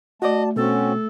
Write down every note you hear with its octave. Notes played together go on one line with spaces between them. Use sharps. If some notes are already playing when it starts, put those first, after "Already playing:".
A3 F#4 D5 D#5 A5
B2 C4 C#4 F#4 A4